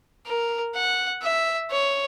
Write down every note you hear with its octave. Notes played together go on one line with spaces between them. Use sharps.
A#4
F#5
E5
C#5